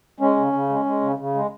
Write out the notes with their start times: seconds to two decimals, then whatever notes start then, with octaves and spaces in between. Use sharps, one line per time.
0.20 G#3 C#4
0.36 C#3
0.53 C#3
0.69 G#3
0.85 G#3
1.01 C#3
1.18 C#3
1.34 G#3